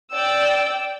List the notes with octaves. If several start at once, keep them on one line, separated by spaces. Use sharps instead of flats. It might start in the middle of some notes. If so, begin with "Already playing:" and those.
D5 G5 E6